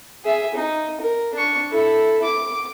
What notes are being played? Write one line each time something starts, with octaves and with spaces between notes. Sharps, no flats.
G#4 E5
D#4
A#4
D4 C#6
E4 A4
D6